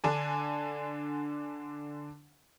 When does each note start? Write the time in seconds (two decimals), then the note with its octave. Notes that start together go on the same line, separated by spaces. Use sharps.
0.04 D3 D4 G#5